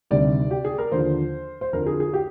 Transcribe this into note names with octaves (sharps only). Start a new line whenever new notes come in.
D2 C3 D#3 G3 D5
G4
G#4
A#4
D#2 D3 F3 C5
C5
F2 D3 F3 A#4
G#4
G#4
G4